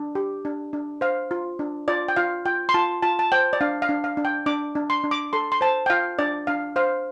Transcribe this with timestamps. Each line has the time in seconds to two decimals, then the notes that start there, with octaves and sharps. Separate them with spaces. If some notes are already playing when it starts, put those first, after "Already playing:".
Already playing: D4
0.15 G4
0.45 D4
0.73 D4
1.01 C5 F5
1.31 F4
1.59 D4
1.88 F4 D5
2.08 G5
2.16 F4 F5
2.45 F4 G5
2.69 C6
2.74 F4 A5
3.02 F4 A5
3.19 A5
3.32 C5 G5
3.53 D5
3.61 D4 F5
3.82 F5
3.89 D4
4.04 F5
4.17 D4
4.25 G5
4.46 D4 D6
4.75 D4
4.90 C6
5.04 D4
5.11 D6
5.33 A4 C6
5.52 C6
5.61 C5 A5
5.86 G5
5.90 F4 F5
6.19 D4 D5
6.47 D4 F5
6.76 C5 F5